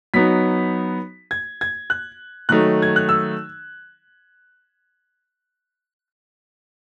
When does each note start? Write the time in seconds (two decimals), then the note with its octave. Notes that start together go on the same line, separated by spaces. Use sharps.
0.14 F#3 B3 D#4 B6
1.31 G#6
1.61 G#6
1.90 F#6
2.49 D#3 F#3 A3 D#4 F#6
2.82 G#6
2.96 F#6
3.09 E6